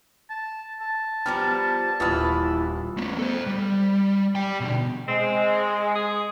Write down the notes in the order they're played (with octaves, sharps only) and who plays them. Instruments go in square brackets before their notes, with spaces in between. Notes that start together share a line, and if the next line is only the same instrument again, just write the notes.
[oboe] A5
A5
[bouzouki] F3 G3 B3 [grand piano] G5 A#5 F6
[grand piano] D#1 D#6 F6 [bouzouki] E3 E4
[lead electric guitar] A3 B3
A4 C5
G3
D5 G5
B2 D3
[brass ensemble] G#3 [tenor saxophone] C4
[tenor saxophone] G#4